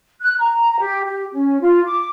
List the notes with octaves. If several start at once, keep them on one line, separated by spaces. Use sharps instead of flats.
F#6
A#5
G4
G4
C#4
F4
D6